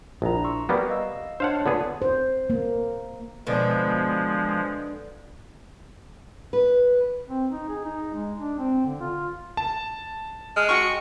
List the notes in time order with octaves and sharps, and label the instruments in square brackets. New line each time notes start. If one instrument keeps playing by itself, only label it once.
[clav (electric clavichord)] A#1 [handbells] D4 E4 A#5
[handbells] C6 C#6 E6
[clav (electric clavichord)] G3 A#3 B3
[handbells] D#5 F5 E6
[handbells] D4 C#5 A5 [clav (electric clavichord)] C5 F5 F#5
[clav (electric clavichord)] D3 B3 G#4 [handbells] F4
[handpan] C5
A#3
[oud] B2 D3 [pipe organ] F3 G#3
[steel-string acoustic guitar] B4
[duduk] C4
D#4
G#4
D#4
G#3
D4
C4
D3
F4
[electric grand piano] A5
[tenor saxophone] G#3 [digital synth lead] F6
[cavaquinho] F#4 G5 C#6 [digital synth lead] C#7